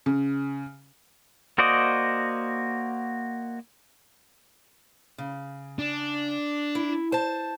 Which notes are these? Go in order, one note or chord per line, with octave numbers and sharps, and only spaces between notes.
C#3
A#3 F#4 C5 D5 D#5
C#3
D4
E4
C5 A5